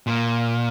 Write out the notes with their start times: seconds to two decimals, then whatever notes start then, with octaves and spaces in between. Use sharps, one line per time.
0.07 A#2